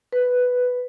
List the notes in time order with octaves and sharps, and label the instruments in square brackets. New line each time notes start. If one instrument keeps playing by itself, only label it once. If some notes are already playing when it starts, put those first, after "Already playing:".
[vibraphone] B4